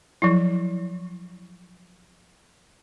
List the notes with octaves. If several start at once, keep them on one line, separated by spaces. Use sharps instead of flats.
F3 F#3 E4